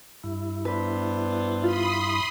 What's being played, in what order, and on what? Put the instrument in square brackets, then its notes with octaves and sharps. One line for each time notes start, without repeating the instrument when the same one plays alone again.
[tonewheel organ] G2 E4
[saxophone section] B3 D4 C5 [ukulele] B4
[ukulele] F4 [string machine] B5 C6 D#6